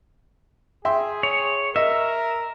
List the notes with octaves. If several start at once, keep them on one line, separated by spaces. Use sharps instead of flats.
G#4 E5 G5 C6
C#5
A#4 D#5 E5